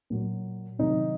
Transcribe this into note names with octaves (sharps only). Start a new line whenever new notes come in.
A#2 F#3
C3 D#3 F#3 D#4